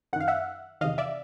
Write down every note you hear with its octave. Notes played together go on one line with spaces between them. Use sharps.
F#2 D#3 F5 F#5
E5 F#5
E2 C3 D#3 D#5 F5
D5 E5